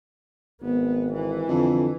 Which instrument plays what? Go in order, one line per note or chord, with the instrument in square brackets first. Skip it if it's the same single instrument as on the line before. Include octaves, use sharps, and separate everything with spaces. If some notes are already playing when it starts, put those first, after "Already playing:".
[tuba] G#1 [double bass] B3
[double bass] E3
[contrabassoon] F2 [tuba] D3